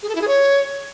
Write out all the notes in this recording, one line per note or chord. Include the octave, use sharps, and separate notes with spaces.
G#4
A4
E4
G#4
C#5